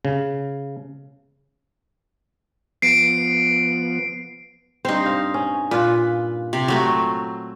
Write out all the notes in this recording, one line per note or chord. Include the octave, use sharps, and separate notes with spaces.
C#3
F3 B3 C7 D7
G2 C4 D#4 C5
F5
C#4
A#2 F4 B4
C3
F#3 A3 C4